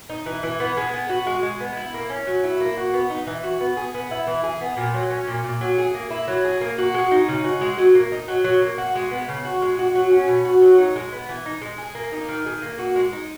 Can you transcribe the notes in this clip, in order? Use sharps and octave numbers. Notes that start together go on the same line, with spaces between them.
D#4
E3
E3
B3
G#3
B3
F#4
G#3
G#3
B3
E4
A#3
C#4
F#3
E4
A#3
F#4
B3
D#4
E3
F#4
B3
G#4
B3
E4
E3
G#4
B3
A#2
F#3
C#4
A#2
A#2
F#3
G#4
A#3
E4
F#3
G#4
A#3
F#4
G#3
D#4
C#3
F#4
G#3
F#3
A#3
D#4
F#3
F#3
A#3
F#4
G#3
B3
C#3
F#4
G#3
F#4
F#3
C#4
B2
F#4
F#3
D#4
G#3
B3
E3
D#4
G#3
G#4
A#3
D#4
D#3
G#4
A#3
F#4
G#3
D#4